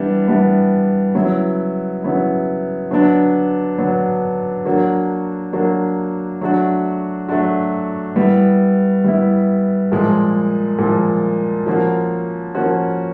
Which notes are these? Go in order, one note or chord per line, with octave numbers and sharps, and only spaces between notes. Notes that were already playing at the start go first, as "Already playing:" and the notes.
Already playing: E3 G3 B3 D4
E3 G3 B3 D4
C#3 F#3 B3 E4
C#3 F#3 B3 E4
D3 F#3 B3 D4
D3 F#3 B3 D4
F#3 A#3 D4 F#4
F#3 A#3 D4 F#4
F#3 A3 D4 F#4
F#3 A3 D4 F#4
G3 B3 E4
G3 B3 E4
A#2 F3 G#3
A#2 F3 G#3
F3 A#3 C#4 F#4
F3 A#3 C#4 F#4